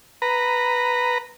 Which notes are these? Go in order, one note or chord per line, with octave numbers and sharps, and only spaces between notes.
B4 A#5